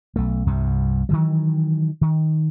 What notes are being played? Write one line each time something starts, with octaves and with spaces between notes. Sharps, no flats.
B1 A3
C2 G2 C3
D#3 E3 F#3
D#3